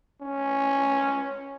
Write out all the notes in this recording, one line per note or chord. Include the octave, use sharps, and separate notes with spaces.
C#4